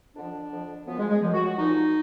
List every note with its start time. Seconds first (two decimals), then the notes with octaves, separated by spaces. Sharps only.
0.15 F2 D3 F3 D4
0.51 F2 D3 F3
0.86 F#2 F3 B3
0.98 G#3
1.09 G#3
1.22 F#2 F3
1.33 F#4
1.45 F#4
1.56 A#2 F3 D#4